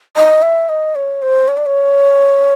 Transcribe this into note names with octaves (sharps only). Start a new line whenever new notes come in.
D#5
E5
D#5
C#5
C5
C#5
D5
C#5